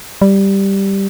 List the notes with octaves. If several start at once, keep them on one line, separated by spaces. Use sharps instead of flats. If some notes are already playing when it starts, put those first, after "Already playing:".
G3